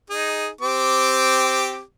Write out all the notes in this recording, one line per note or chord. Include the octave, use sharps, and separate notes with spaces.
D#4 G#4
C4 G4 D6